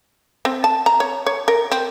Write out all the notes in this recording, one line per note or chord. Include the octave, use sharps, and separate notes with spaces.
C4
A5
A#5
C#5
C#5
A#4
C4